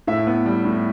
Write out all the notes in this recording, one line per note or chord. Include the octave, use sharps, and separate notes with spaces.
A2 E5
B3
G3
A2